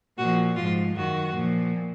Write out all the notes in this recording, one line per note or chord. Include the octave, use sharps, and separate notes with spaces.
A#2 F3 F#4
G#2 F3 F4
F#2 D#3 F#4
A#2 F3